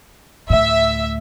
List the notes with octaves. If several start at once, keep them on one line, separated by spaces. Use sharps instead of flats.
D2 A2 E5